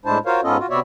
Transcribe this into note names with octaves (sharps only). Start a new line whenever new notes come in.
A2 G#3 D4 E4 C5 A5
F4 F#4 A#4 C5 C#5 F5
G#2 B3 C#4 F4 A4 D#5
F4 F#4
C3 B3 F#4 C#5 D5 E5